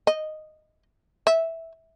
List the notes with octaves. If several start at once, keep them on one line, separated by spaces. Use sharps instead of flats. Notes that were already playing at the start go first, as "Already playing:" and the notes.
D#5
E5